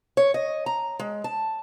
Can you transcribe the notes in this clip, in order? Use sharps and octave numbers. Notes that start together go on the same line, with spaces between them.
C#5
D#5
A#5
G#3
A5